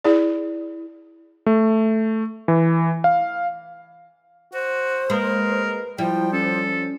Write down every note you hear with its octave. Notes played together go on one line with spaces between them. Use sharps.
E4 G#4 D5
A3
E3
F5
F#4 C5
G#3 A#3 A#4 B4
F3 G3 E4 G5
C#4 A4